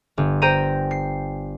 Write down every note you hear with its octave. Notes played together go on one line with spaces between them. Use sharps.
G1
C5 G5 A#5 D#7
C7